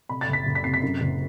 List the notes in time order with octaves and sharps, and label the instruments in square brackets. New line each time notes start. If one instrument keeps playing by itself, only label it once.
[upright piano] C3 B5
A6
F#1
B6
F#1
B6
C3 C7
B6
F#2
F#1